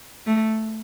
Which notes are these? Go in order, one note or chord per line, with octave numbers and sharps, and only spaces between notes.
A3